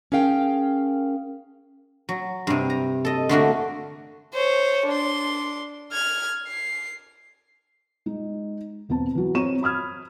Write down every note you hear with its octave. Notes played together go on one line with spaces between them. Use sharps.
C#4 G#4 A#4 F5 G5
F#3
G2 C3
A#5
A4 D#5
D3 A3 A#3 F#4
C5 C#5
D4 C6
F6 G#6
C7
G#3 D#4
E1 B3 C4 A5
E3 F#3
C4 C#5 A#5 C#6 D#7 E7
B5 D#6 F6 G#6